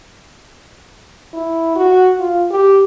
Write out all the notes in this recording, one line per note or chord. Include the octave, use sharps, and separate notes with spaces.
E4
F#4
F4
G4